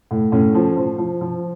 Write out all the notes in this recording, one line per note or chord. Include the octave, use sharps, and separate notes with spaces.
A2
A2 C#4
F3
F3
F3
F3